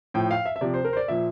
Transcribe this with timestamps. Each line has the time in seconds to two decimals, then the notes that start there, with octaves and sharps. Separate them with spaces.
0.14 A2 F3 G5
0.31 F5
0.46 E5
0.56 E5
0.61 C3 F3 D5
0.74 C5
0.85 A#4
0.93 C5
0.97 D5
1.08 A#2 F3 E5